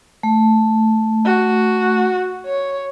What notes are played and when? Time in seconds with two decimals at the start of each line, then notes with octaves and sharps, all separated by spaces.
0.23 A3
1.26 F#4
2.46 C#5